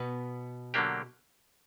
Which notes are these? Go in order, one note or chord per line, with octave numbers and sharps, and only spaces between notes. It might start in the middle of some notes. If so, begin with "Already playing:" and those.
Already playing: B2 B3
D3 F#3 A#3 D4 G4